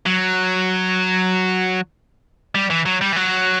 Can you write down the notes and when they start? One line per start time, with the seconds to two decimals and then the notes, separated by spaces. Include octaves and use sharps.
0.06 F#3
2.55 G3
2.70 E3
2.86 F#3
3.01 G3
3.12 E3
3.16 F#3